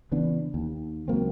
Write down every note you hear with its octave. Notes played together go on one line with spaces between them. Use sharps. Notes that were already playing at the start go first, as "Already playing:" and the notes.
C#3 E3 B3 D4
D#2
C#2 F#3 A#3 C4